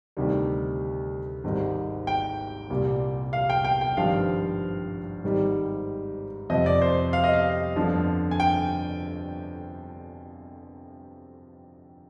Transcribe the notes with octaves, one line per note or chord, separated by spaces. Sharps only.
D2 C3 D#3 G3
G#1 G#2 G3
G5
C2 A#2 G3
F5
G5
G5
G5
G#1 G2 F3 F5
G#1 G#2 G3
F2 C3 F3 D#5
D5
C5
F5
D#5
F5
G1 F2 D3 F3
G#5
G5